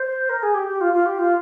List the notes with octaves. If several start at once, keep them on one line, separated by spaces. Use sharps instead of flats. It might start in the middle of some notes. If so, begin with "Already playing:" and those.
Already playing: C5
A#4
G#4
G4
G4
F4
F4
G4
F4